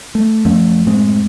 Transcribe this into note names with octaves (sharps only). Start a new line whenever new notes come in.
A3
F#2 F3 A3 C#4
F#2 A2 G#3 C4